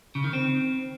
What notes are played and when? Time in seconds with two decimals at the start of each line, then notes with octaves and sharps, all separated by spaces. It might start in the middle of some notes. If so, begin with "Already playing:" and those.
0.15 C#3
0.24 D#3
0.33 C4